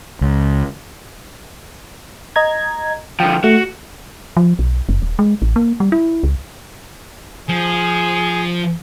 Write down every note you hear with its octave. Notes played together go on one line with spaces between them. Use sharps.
C#2
D#5 A#5 G#6
D3 F3 G5
A3 F#4
F3
B1
F#1
D#1
G#3
A1
A#3
G3
E4
C#2
F3 G#4